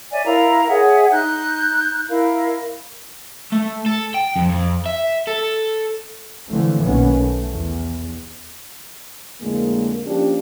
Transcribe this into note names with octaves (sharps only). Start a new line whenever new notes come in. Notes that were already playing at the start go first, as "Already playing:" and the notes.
C#5 D5 E5 G#5
E4 A#4 F5 A#5
G#4 C#5 E5 F#5
D#4 F#6 G6
E4 A#4 F5
A3
A4
G5
F2
F2
E5
A4
D3 E3 F3 A3 C4
B1 D#3 A#3 B3 C#4
A3
E2
F2 A2 D3 G#3 A#3
F3 A#3 C#4 D4 F4 G4